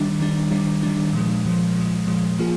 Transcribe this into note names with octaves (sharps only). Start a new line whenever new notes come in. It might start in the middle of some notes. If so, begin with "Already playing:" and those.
Already playing: D#3 G3 D4
D#3 G3 D4
D#3 G3 D4
D#3 G3 D4
A#2 F3 G#3
A#2 F3 G#3
A#2 F3 G#3
A#2 F3 G#3
F3 A#3 F4 G#4